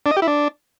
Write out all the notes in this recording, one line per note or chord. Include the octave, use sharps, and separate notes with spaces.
D4
D#5
G4
E4
D4